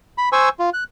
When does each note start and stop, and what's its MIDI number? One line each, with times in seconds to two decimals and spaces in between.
0.18 0.29 83
0.33 0.49 72
0.33 0.49 80
0.33 0.49 85
0.33 0.49 88
0.59 0.70 65
0.74 0.84 90